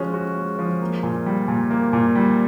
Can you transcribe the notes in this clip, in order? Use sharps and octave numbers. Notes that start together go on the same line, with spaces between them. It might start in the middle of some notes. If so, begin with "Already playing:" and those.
Already playing: F3 G#3 C#4 F#4
F#4
G#3
F3
A#3
A#2
G3
A#2
A#3
A#2
G3